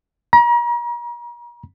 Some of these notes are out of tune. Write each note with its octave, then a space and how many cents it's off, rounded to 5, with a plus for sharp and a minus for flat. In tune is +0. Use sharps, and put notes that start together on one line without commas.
A#5 +40